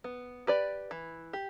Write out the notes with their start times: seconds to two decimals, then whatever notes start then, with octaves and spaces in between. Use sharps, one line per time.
0.04 B3
0.47 G4 B4 D5
0.91 E3
1.33 G4